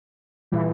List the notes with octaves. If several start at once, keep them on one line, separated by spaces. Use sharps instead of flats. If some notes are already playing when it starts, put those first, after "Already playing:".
A#2 E3 G3